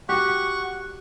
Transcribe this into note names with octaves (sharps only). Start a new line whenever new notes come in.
F#4 G4 F#5 C#6